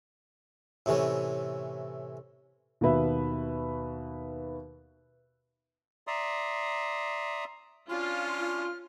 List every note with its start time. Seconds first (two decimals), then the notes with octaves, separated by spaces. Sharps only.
0.86 A2 C3 E3 C#4
2.81 D#2 B2 B4 E5
6.07 D5 E5 A#5 C6 D#6
7.89 C#4 D4 F4 C6 F6